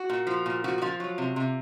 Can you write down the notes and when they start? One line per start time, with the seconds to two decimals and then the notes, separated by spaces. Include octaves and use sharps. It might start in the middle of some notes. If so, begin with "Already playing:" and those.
Already playing: F#4
0.10 A#2
0.27 F3
0.46 A#2
0.64 F3 F#4
0.78 F#4
0.82 F3 F4
1.00 F#3
1.18 C3
1.36 C3